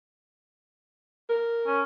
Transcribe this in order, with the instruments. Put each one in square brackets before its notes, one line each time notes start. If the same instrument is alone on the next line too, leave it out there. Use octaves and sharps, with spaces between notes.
[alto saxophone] A#4
[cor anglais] C#4